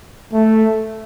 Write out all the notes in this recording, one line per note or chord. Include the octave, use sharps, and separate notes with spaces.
A3